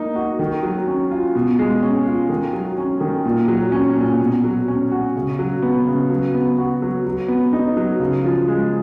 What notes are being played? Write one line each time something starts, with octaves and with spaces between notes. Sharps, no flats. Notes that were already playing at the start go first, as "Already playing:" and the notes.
Already playing: A#3 D#4
F#4
D#3
F#3
C#4
F4
B2
G#3
C#4
F4
D#3
F#3
C#4
D#3
A#2
F#3
C#4
A#2
B2
F#3
C#4
F#4
C#3
F#3
B3
C#3
F#3
B3
F#4
F#3
F#3
B3
D#4
F#3
C#3
F3
G#3